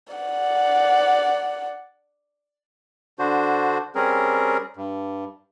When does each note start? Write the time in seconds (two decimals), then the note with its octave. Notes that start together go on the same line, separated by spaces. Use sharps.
0.13 D5 F#5
3.19 D3 D4 F#4 C5
3.95 G3 C4 C#4 G#4 A#4
4.77 G2